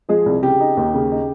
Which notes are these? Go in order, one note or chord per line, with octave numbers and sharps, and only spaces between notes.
F3 G#3 G#4
C2
C#3 G4
D#4
D#2
C#3
D#4